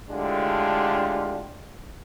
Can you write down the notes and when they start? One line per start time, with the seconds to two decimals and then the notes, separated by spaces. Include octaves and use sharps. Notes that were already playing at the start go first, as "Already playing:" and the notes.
0.11 A2 D3 G#3 D4 F4 G4